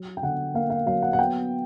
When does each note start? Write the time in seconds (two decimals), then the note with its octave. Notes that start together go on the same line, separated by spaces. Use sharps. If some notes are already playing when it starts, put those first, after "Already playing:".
Already playing: F#3
0.17 G5
0.23 D3 F#5
0.54 A#3 F5
0.70 F5
0.86 F#3 F5
1.02 F#5
1.13 F#5
1.18 B3 G5